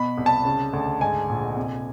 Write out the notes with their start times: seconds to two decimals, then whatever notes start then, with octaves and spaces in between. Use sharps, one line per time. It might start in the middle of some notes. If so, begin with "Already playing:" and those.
Already playing: B2 B5
0.17 C2
0.26 A5
0.45 C#3
0.73 D2
1.00 G#2 G#5
1.29 A#1
1.56 C3